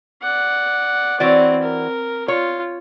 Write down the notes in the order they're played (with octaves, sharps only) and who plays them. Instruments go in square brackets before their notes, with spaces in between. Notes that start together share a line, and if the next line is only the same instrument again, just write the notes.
[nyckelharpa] D5 F#5
[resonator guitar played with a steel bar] E3 F#4 D5 [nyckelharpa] C4 C#5
[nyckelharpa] A#4
[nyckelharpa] F4 [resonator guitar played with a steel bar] C#5